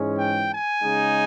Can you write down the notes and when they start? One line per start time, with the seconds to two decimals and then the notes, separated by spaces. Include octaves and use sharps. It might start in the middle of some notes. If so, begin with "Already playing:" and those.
Already playing: G#2 E3 G#3 C#4
0.18 G5
0.51 G#5
0.83 C#3 G#3 D#4